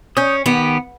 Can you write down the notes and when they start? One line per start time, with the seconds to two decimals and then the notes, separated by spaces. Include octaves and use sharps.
0.17 C#4 D#6 G6
0.46 D#3 B3 G4